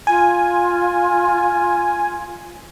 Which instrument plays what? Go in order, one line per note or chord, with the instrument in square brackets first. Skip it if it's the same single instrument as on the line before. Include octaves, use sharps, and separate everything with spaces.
[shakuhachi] F4 [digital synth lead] G#5